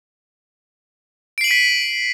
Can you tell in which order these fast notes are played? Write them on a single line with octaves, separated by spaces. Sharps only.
D7 C7 F#7 D#7 B6